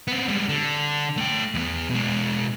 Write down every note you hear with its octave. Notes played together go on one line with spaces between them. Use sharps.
B3 C4
G3 G#3
D3
A3 G5
E2 B3
B2 G#3